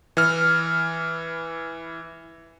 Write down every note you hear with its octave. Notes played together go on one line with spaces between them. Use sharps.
E3 F6